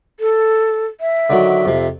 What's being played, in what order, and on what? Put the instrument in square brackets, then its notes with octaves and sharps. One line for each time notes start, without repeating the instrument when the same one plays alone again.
[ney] A4
E5
[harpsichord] D3 D#3 F#3
F2 C3